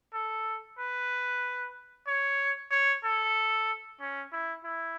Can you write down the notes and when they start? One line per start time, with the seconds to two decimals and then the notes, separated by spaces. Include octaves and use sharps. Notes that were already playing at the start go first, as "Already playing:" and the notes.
0.14 A4
0.79 B4
2.07 C#5
2.71 C#5
3.04 A4
4.00 C#4
4.32 E4
4.64 E4